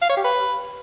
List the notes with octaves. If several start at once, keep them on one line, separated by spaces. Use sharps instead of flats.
F5
C#5
G4
B4